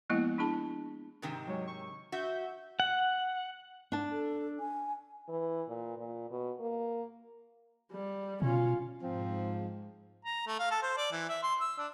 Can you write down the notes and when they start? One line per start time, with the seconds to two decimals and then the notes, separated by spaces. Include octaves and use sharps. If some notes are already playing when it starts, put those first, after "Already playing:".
0.10 F3 G#3 A#3 B3 E4 D#5
0.38 D4 E4 G#4 A5
1.22 G#2 C3 D#3
1.47 F#3 G#3 C#5
1.67 C#6
2.12 F#4 E5 G6
2.80 F#5
3.92 D4 A5
4.12 A4
4.60 G#5
5.29 E3
5.69 A#2
5.98 A#2
6.31 B2
6.60 A#3
7.92 G3
8.42 B2 C#4 F4
9.02 G#2 F3 C4
10.25 A#5
10.47 A3
10.59 F5
10.71 A4
10.83 C5
10.97 D5
11.12 E3
11.29 E5
11.43 C6
11.60 E6
11.78 D4